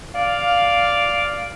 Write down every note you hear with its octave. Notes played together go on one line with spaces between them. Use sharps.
D5 F5